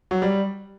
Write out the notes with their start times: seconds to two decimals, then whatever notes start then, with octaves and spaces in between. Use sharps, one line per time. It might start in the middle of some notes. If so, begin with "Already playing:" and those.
0.11 F#3
0.22 G3